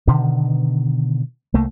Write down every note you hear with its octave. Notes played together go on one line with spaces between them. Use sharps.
B2 D3 D#3
C2 A3 A#3